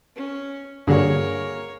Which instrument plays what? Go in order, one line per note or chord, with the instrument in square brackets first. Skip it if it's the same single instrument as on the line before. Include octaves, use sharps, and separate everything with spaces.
[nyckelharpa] C#4
[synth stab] G2 D3 [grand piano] A#3 F#4 G#4 [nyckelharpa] A#4 C#5